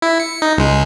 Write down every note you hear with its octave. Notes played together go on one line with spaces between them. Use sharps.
E4
C#7
D#4
C#2 G#3